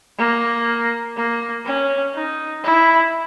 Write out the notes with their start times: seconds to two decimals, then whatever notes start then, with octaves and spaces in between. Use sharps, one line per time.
0.18 A#3
1.16 A#3
1.65 C#4
2.14 D#4
2.64 E4